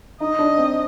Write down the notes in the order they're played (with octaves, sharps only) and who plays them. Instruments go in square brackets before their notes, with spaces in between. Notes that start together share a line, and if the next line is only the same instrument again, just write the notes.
[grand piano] D#4 [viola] D#5
[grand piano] D4
C4